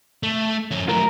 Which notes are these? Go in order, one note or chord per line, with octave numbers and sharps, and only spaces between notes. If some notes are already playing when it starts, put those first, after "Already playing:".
A3
F2 C#4
F#3 A3 A#4